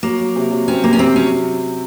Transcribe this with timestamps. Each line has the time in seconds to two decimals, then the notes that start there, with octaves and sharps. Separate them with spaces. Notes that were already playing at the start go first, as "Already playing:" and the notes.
0.03 F#3 A#3
0.19 F#3
0.36 C3
0.51 F#3
0.68 C4 C#4
0.83 C3 A#3
0.93 C#4
0.99 C3 C4
1.15 F#3 C#4